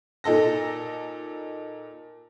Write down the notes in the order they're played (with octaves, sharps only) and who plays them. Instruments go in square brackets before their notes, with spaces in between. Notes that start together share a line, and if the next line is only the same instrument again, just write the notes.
[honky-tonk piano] A#2 D#4 A4 A#6